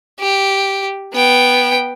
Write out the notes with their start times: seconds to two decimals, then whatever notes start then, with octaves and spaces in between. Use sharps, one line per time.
0.20 G4
1.14 B3 G5